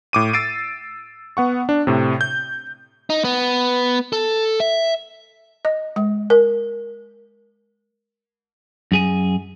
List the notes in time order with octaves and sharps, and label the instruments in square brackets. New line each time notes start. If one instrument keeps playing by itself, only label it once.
[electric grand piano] A2 D6 D#7
E6 A6 C7 D7 D#7
B3 F#5 C#6
D4
A2 C3
G6
[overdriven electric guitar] D#4
B3
A4
E5
[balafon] D#5
G#3
A#4
[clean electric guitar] F#2 G#4 G#5